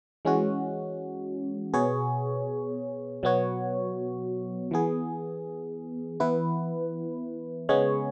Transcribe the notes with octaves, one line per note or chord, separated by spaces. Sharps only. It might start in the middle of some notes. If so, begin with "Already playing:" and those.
E3 G#3 C#4 F#4
B2 B3 G#4 C#5
B2 F#3 B3 F#4 C#5
E3 B3 G#4
E3 B3 E4 B4
C#3 G#3 B3 G#4 C#5